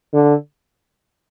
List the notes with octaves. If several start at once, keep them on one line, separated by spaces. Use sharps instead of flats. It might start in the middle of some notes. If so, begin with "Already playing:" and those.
D3